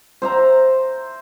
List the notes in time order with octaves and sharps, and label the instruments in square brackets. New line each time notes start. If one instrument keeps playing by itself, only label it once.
[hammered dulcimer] C5 E5 A#5